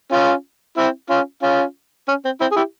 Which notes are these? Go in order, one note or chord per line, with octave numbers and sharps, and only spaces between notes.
C#4 F4
C4 E4
C#4 F4
C#4 F4
C#4
C4
C4 E4
G#4
E4 G4